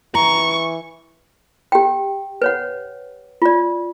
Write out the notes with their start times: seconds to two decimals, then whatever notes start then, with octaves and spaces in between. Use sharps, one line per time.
0.15 E3 A#5 C#6
1.72 G4 G5
2.42 B4 C#5 F#5
3.42 F4 D5